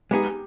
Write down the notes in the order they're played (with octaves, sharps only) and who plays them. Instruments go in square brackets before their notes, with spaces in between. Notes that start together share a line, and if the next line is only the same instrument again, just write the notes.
[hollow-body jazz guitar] G#3 B3 D#4 G#4 [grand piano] G4